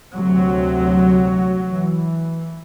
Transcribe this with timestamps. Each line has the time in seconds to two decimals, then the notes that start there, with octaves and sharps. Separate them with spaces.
0.14 D2 C3 F#3
1.68 E3